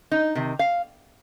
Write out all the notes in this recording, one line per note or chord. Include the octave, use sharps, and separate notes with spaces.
D#4
C3 D#3
F5